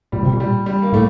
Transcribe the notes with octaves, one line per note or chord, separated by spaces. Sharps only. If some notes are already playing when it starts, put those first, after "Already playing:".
A#2 G3
C3
A#2
G3
G3
A#3
A2 A3